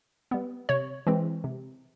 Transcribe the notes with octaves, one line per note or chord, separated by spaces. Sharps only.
G3 B3
C3 C#5
E3 G#3 C4
C3